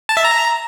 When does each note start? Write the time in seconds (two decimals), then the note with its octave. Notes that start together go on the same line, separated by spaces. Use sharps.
0.09 A5
0.17 E5
0.24 A#5